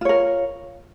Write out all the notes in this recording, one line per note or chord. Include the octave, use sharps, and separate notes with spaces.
F4 A#4 C#5